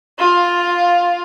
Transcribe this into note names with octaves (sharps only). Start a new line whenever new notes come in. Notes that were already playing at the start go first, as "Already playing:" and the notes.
F4 F5